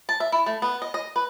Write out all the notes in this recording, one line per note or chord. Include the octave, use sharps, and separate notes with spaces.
A5
E5
E4
A3
B3
D#5
D#5
B4